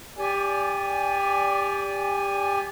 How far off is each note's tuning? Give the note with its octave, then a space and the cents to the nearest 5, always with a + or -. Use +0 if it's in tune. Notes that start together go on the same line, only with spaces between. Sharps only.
G4 +20 D5 -20 G#5 +0